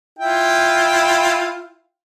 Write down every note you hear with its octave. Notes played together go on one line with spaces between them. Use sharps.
E4 F4 G5